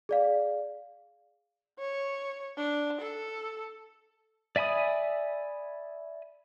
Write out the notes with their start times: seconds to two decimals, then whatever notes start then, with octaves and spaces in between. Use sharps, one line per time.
0.09 G#4 D5 F5
1.79 C#5
2.57 D4
3.00 A4
4.56 D5 E5 G#5 B5 D#6